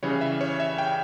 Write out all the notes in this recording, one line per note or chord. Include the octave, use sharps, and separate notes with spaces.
C#3 E3 G3 C#5
E5
C#5
E5
G5